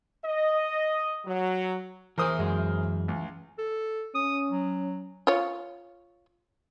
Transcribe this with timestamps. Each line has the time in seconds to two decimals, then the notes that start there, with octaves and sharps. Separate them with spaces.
0.25 D#5
1.25 F#3
2.18 E3 G#4 A#4 C5 D#6
2.39 F#2 G#3
3.08 C#2
3.59 A4
4.15 C#4 D#6
4.52 F#3
5.27 F4 C#5